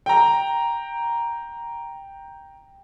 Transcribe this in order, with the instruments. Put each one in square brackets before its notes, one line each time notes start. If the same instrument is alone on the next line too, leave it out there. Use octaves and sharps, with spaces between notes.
[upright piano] G5 A#5